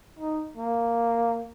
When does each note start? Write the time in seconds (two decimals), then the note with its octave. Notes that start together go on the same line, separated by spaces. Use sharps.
0.19 D#4
0.57 A#3